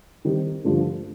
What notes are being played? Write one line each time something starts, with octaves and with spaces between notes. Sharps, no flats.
D#3 G3 C4 D#4
G2 D3 F3 A3